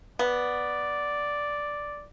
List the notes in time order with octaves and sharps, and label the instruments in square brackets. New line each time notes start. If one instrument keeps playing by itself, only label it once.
[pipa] B3 [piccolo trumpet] D5